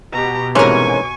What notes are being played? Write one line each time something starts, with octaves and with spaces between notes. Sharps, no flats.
B2 G4 A#5
G#2 C3 E3 C#4 A#4 G#5 C#6